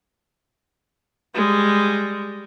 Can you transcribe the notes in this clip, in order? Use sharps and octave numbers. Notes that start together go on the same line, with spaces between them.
G3 G#3